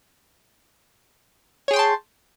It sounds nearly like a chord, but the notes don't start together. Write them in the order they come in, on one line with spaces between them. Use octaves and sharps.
C#5 G#4 G5 C6 A5